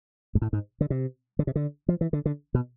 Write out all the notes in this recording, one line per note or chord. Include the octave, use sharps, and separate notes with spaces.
G#2
A2
G#2
D3
C3
D3
C3
D3
F3
E3
D3
D3
B2